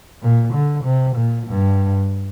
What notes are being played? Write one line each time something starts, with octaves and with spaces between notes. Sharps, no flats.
A#2
D3
C3
A#2
G2